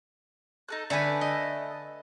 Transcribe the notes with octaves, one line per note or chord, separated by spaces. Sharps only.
D#4 A4 F#6
D3 A3 A4 B4 G#5
D#5